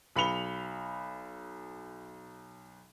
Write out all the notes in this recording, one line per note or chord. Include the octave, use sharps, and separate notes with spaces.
B1 B5 C#7 F7 G7